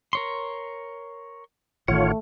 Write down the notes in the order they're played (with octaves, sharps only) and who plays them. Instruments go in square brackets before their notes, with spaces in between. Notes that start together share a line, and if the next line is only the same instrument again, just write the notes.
[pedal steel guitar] A#4 C#5 C6
[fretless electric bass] A1 D#3 [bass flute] A3 [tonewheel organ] F4 C#5 [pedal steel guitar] F#5